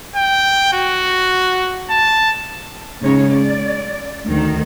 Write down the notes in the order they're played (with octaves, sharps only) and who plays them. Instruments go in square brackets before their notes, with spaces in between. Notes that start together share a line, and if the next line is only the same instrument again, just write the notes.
[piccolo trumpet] G5
F#4
A5
[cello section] C#3 G#3 C#4 D#4 C#5
D5
D2 D#3